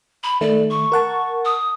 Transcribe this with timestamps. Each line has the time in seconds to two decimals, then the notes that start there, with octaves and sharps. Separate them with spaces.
0.23 B5
0.41 D#3 A3 D5
0.70 C#6
0.92 A#4 F#5 A5
1.45 D#6